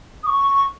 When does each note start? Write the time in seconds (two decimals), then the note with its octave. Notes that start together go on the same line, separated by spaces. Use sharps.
0.23 D#6
0.26 C#6